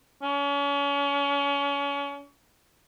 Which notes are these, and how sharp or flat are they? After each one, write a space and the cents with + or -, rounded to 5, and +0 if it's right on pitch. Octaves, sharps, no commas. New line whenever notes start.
C#4 +35